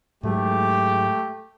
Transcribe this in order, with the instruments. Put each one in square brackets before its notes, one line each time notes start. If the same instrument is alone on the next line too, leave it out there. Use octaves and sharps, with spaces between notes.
[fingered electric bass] G#2 F#3 G#3 [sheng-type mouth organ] A3 [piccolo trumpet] G4